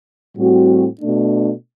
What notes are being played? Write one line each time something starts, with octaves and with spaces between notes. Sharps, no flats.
A2 G3 C4 F#4
B2 A3 D4